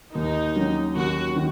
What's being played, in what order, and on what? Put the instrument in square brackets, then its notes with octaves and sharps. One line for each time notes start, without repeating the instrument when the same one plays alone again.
[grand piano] D#2 [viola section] D#4
[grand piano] D#3 F#3 C#4
[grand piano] D#2 [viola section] F#4
[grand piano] D#3